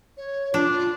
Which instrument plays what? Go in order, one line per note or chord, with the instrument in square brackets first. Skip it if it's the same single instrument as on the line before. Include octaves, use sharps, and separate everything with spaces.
[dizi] C#5
[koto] D4 [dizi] F4